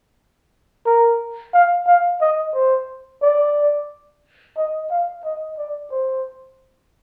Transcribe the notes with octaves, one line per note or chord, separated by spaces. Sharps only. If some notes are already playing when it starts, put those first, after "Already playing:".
A#4
F5
F5
D#5
C5
D5
D#5
F5
D#5
D5
C5